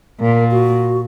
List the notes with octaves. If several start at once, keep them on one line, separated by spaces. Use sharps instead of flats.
A#2 A#4
F#4